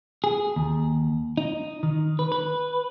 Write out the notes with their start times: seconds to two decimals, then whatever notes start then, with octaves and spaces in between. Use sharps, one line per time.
0.24 G#4
0.56 D#2
1.37 D#4
1.83 D#3
2.19 B4
2.32 B4